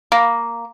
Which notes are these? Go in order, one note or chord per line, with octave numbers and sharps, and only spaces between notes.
A#3